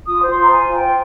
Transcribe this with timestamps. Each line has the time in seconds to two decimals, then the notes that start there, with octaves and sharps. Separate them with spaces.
0.06 F4 D#6
0.22 C5
0.29 C6
0.37 F4
0.42 A#5
0.52 C5 G#5
0.68 F4
0.75 G5
0.82 C5